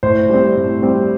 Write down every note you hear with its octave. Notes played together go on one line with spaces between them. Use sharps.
A2 C5
G3 C4
A2
G3 C4